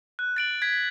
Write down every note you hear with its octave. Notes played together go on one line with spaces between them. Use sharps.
F#6
A6 D7 F#7
G#6 B6